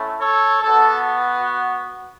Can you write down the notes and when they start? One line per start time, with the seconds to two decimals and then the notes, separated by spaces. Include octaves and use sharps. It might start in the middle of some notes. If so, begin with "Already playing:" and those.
Already playing: A3 C#4 E4
0.20 A4 C#5
0.62 B3 F#4 A4